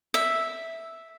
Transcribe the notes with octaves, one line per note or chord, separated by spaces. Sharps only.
E5